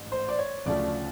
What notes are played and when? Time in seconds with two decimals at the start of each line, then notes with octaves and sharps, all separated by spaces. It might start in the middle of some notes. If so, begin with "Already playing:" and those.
Already playing: A1 G#2
0.12 C5
0.29 D5
0.39 C#5
0.66 D2 C#3 F3 A3 D5